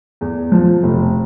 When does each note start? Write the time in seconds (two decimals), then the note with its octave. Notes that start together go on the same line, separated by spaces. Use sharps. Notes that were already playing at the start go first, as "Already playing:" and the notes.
0.21 E2
0.52 F3
0.83 F1